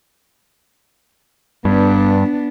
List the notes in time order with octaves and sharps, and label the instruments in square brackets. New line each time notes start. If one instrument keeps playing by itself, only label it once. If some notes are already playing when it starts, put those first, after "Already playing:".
[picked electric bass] G2 [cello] B3 D4